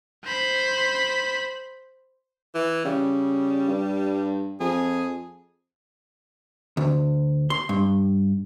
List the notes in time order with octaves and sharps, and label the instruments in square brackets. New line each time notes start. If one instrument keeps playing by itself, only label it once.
[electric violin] C5 B5
[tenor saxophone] E3
[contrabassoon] C#3 [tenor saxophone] G3
[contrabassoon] G2
[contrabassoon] F2 [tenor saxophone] G#4
[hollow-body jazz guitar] D2
C6
G2